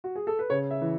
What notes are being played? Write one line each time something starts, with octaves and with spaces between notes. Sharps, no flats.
F#4
G#4
A4
B4
C#3 C#5
E5
E3